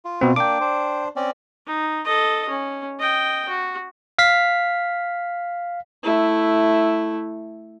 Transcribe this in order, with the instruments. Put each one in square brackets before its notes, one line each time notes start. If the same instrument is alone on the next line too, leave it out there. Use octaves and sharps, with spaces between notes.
[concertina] F4
[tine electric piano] B2 C4
[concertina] A#3 D4 [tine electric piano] G5 D6
[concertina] D4 C5
C4 C#4 D5
[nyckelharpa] D#4
A4 D#5
C#4
D#5 G5
F#4
[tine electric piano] F5 B6
[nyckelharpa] A3 E4